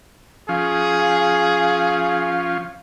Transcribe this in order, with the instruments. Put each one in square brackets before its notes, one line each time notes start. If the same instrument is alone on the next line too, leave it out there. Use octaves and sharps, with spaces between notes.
[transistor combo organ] F3 C#4 F4 [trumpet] G#4 [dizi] F5